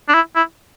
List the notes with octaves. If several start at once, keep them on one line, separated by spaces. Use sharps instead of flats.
D4
E4
E4